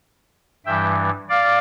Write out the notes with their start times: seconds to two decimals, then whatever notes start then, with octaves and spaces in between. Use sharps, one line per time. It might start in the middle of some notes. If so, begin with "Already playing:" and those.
0.66 G2 E3 G3 E5 G5
1.29 D5 F5